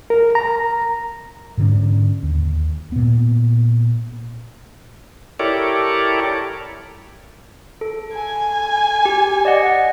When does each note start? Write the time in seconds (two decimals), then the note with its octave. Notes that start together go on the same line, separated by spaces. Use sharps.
0.10 A#4
0.35 A#5
1.58 G#2 D3 C#4
2.23 D#2
2.92 A#2 B3
5.40 E4 G4 A4 A#4 C#5 D5
7.81 A4
8.15 G#5
9.05 G4
9.45 D5 D#5 F#5